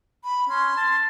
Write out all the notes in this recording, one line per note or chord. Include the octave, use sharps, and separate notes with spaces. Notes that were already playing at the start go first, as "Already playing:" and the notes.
B5
C#4 C6
A5